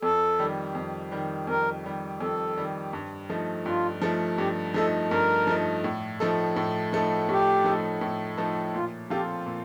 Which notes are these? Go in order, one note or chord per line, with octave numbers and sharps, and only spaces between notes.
F2 A4
D#3 G3
F2
D#3 G3
F2 A#4
D#3 G3
F2 A4
D#3 G3
G2
F3 A3 D#4
G2 F4
F3 A3 D#4
G2 G4
F3 A3 D#4 A4
G2 A#4
F3 A3 D#4
A2
F3 A3 D#4 A4
A2
F3 A3 D#4 A4
A2 G4
F3 A3 D#4 A4
A2
F3 A3 D#4 A4
A#2 F4
F3 C4 F4 G4 A4
A#2